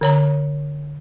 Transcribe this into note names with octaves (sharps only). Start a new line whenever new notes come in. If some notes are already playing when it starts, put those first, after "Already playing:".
D3 C#5 A#5